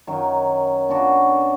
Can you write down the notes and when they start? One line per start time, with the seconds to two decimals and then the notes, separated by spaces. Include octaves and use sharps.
0.07 F#2 D#3 F#3
0.89 B3 D4 F#4